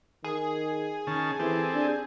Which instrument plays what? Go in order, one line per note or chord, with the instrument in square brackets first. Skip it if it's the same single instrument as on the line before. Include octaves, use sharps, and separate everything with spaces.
[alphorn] D#3 [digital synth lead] G#4
[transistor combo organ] D#3 C#4 A5
[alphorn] E3 [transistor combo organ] C4 G4 A4
[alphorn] D4